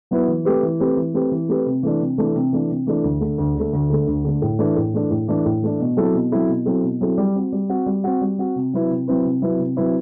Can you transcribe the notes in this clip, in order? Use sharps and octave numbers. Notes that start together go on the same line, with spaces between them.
F#3 B3 E4 B4
E3
A3 C4 G4 B4
E3
A3 C4 G4 B4
E3
A3 C4 G4 B4
E3
A3 C4 G4 B4
C3
E3 A3 D4
C3
E3 A3 D4
C3
E3 A3 D4
C3
E3 A3 D4
D2
D3 A3
D2
D3 A3
D2
D3 A3
D2
D3 A3
A2
E3 A3 D4
A2
E3 A3 D4
A2
E3 A3 D4
A2
E3 A3 D4
B2
F#3 C4 E4 A4
B2
F#3 C4 E4 A4
B2
F#3 C4 E4 A4
B2
F#3 C4 E4 A4
G3
C4 F#4
G3
C4 F#4
G3
C4 F#4
G3
C4 F#4
C3
F#3 C4 E4 B4
C3
F#3 C4 E4 B4
C3
F#3 C4 E4 B4
C3
F#3 C4 E4 B4